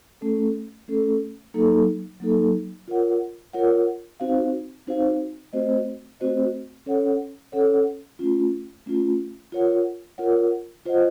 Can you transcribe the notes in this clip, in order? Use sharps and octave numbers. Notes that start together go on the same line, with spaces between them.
A3 C#4 A4
A3 C#4 A4
F#3 A#3 D#4 A4
F#3 A#3 D#4 A4
F4 A#4 C#5 F#5
F4 A#4 C#5 F#5
C4 D#4 F#4 C5 F5
C4 D#4 F#4 C5 F5
A3 C4 F#4 C5 D#5
A3 C4 F#4 C5 D#5
C#4 A4 C#5 F#5
C#4 A4 C#5 F#5
A3 C#4 F4
A3 C#4 F4
F4 A#4 C#5 F#5
F4 A#4 C#5 F#5
F4 C5 D#5 F#5